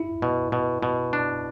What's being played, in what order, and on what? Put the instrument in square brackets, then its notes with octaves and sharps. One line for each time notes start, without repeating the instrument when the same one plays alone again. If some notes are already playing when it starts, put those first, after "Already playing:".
Already playing: [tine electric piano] E4
[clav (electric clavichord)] B2
B2
B2
D4